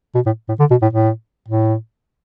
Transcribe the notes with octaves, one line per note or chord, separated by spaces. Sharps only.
B2
A2
A2
D3
B2
A2
A2
A2